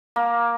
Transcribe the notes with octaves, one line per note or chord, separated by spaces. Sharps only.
A#3